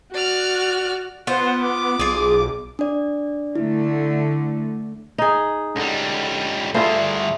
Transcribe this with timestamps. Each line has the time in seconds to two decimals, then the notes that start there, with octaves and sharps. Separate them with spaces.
0.14 F#4 D5 F6
1.27 B3 F4 C5 F#5
1.62 D6
1.99 B1 F4 G#4
2.79 D4 D5
3.55 D3 A3 E4
5.18 D#4 G#4
5.76 C#2 D3 G3
6.74 G2 D3 A3 E4 F4 G#4 C5